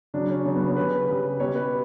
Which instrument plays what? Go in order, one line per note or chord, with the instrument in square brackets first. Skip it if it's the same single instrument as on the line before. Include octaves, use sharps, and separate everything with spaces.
[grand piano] C#3 F#3 D4
C#4
C#3 F#3 C#4
B3
C#4
C#3 G3 B4
C#3 G3
B2 G3 C#5
B4